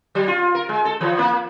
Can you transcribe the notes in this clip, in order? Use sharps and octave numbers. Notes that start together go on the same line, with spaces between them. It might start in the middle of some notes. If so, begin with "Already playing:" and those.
F#3
F4
A#4
G#3
A4
E3
A#3